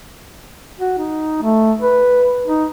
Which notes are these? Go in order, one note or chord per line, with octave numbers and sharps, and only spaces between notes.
F#4
D#4
A3
B4
D#4